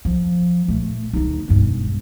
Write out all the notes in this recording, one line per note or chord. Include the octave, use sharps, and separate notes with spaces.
F3
A#2 A3
D2 D#4
E1 G2